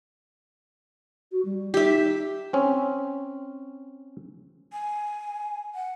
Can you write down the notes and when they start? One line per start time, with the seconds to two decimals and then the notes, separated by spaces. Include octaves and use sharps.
1.32 F#4
1.45 G3
1.74 D#4 G4 E5
2.53 C4 C#4
4.73 G#5
5.74 F#5